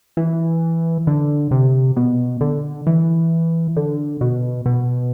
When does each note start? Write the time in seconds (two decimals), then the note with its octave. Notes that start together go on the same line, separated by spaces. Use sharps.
0.17 E3
1.07 D3
1.51 C3
1.97 B2
2.41 D3
2.87 E3
3.77 D3
4.21 B2
4.66 B2